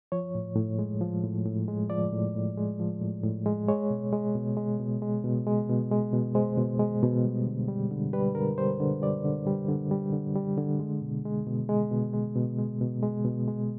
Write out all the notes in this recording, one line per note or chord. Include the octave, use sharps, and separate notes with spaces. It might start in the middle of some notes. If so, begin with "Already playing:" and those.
F3 C#5
A2
A2
G#3
F3
A2
A2
G#3
F3 D5
A2
A2
G#3
F3
A2
A2
G#3
G#3 C#5
B2
G#3
B2
G#3
B2
G#3
B2
G#3
B2
G#3
B2
G#3 C5
B2
G#3
B2
G3
D3
G3
D3
G3 B4
D3 A#4
G3 C5
D3
G3 D5
D3
G3
D3
G3
D3
G3
D3
G#3
B2
G#3
B2
G#3
B2
G#3
B2
G#3
B2
G#3
B2
G#3